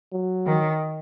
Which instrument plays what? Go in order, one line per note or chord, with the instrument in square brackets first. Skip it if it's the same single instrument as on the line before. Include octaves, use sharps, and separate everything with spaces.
[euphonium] F#3
[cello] D#3